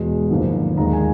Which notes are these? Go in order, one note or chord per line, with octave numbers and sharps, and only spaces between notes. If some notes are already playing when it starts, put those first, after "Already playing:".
Already playing: E2 B2 G#3
G#1 F#2 D3 F3 A#3
D#2 D#3 G#3 A#5
G#5